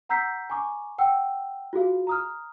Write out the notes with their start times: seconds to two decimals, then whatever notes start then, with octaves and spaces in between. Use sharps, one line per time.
0.09 F#5 A#5 E6 G6 B6 C7
0.50 G#5 A#5 C#6 D6
0.98 F#5 G5 E6
1.73 F4 F#4 G#4 F5
2.07 A#5 D#6 F6